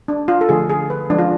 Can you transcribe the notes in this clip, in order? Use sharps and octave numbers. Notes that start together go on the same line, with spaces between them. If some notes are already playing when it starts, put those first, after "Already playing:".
D4
F4
A4
D3 F3 A3 G#4
G#4
B4
F3 G#3 C#4 D4
F4